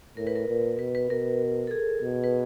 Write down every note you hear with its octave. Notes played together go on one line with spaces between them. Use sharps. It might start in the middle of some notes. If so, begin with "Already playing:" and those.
A2 A#4
B4
A#4
A#2
B2 B4
B4
B2 A#4
A4
G#4
B2
B4